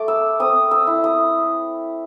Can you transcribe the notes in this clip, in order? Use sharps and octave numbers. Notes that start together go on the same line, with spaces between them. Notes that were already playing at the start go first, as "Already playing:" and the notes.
Already playing: A3 D6
E6
C4 D#6
E6
E4
D#6